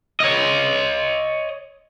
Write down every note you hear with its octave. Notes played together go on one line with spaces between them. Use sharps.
C#5 D#5